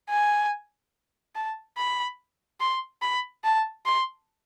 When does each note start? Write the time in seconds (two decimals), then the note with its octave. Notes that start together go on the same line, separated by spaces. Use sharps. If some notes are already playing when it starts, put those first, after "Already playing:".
0.09 G#5
1.35 A5
1.77 B5
2.60 C6
3.01 B5
3.44 A5
3.85 C6